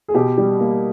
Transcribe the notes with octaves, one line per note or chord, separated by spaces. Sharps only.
G#4
B2 G4
G3
A#3